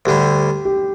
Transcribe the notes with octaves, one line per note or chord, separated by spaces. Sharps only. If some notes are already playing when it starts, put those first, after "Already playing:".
D2 D3 G3 G4
G4